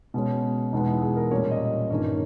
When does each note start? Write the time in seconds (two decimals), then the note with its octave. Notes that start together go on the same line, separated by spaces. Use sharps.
0.14 B2 G#3 C#4
0.72 E2 B2 G#3 B3 D#4
0.87 E4
1.02 G#4
1.16 A#4
1.31 A#2 G3 C#4 C#5
1.51 D#5
1.90 G2 D#3 A#3 C#4 C#5